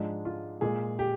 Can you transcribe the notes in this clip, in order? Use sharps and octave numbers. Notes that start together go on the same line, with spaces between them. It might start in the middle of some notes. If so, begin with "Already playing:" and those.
Already playing: G#2 F3 G#3 D4
F4
A#2 G#3 G#4
G4